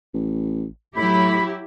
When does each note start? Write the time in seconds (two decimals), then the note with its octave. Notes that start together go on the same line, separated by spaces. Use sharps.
0.14 A1
0.96 A2 F#3 E4 G4 B5